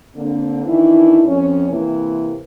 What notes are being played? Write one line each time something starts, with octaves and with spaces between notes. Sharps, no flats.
D3 A#3 C4
D#3 E3 D4 E4
F2 C#4
C3 E3 A#3